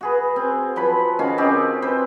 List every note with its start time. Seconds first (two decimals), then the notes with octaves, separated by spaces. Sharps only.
0.01 F#4 G#4 B4
0.36 C4
0.76 F3 F#3 B4 B5
1.19 D#3 C#4 F#4 F5
1.38 C4 C#4 D#4 G4
1.82 C4 B4 C5